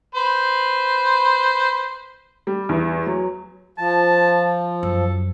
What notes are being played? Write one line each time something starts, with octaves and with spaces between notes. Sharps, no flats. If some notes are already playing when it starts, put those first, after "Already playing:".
B4 C5
G3
E2
F#3
F3 A5
F#2 A4